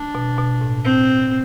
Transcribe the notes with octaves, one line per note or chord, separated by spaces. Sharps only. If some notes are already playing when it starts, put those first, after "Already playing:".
Already playing: D4
B2
B2
A2
C4